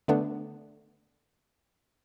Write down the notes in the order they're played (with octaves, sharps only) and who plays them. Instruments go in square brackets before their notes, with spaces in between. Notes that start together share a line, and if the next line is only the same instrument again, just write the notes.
[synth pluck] D3 A3 B3 D4